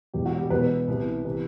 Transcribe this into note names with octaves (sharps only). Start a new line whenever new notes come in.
E1 E2 B2 G4
F#4
G3 G4
E1 E2 B2 B3 B4
C2 C3 E3
C3 E3